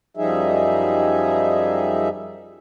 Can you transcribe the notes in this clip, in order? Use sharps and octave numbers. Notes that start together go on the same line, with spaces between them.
F#2 F3 G3 D#4 G#4 E5